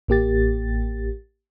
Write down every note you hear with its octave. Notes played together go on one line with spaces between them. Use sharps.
A1 A#3 G4 A6